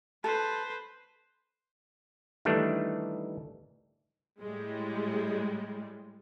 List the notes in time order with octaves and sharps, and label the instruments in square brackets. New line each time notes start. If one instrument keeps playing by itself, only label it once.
[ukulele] A4 [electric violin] B4 C5
[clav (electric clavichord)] D#3 E3 G3 A3 D4
[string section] A2 G3 G#3